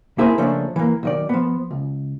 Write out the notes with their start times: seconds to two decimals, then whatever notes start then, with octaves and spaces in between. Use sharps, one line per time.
0.18 A#3 C4 E4 G#4 A#4 C5
0.38 C#3 F3 A3 A#3 C#4 D4
0.76 E3 A#3
1.03 B1 D#3 D5
1.29 F3 B3
1.71 C#2